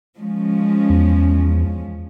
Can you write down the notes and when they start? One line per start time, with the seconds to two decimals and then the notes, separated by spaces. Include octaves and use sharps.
0.18 F3 G#3 C#4
0.90 E2